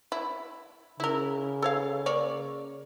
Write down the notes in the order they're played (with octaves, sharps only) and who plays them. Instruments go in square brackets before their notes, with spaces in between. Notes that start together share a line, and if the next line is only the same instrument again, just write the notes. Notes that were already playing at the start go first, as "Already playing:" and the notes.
[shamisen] E4
[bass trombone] C#3 [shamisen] E4 A#4
[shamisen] A4 C#5 F5
A#3 C#5 D5